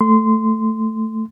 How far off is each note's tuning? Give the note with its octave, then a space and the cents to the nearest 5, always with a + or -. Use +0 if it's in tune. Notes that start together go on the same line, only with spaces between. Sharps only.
A3 +0 C6 -15